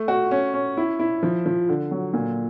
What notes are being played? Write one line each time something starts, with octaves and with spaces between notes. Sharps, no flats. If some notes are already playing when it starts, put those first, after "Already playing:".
Already playing: A3
F#4
C#4
C#4
E4
E4
F3
F3
D3
F#3
A#2